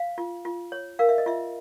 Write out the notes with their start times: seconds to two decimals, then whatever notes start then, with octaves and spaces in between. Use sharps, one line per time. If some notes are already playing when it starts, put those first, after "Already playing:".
Already playing: F5
0.18 F4
0.45 F4
0.72 C#5
0.99 A#4 F5
1.09 E5
1.18 D#5
1.26 F4 E5